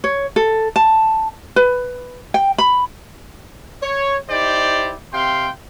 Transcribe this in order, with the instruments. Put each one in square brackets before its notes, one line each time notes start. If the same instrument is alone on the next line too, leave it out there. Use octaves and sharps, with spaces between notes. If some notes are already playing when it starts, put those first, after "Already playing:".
[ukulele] C#5
A4
A5
B4
G5
B5
[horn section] C#5
D#4 E4 G4 C5 D5
C3 F5 G5 C6